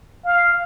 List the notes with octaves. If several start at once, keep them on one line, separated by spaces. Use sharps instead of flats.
F5